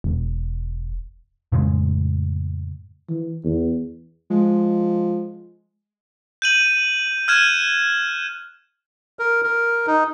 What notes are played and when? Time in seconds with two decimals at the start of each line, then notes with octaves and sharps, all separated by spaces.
0.04 E1
1.52 F2 A2 C#3 G#3
3.09 E3
3.44 E2
4.30 F3 G#3
6.42 G6 D#7 F#7
7.28 F6 F#6 G#6 D#7 E7
9.19 A#4
9.44 A#4
9.87 D#4